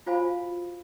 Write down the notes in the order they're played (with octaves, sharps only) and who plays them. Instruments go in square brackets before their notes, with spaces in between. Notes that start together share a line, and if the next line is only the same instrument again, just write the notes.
[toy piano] F4 F#4 C5 F5 G#5 B5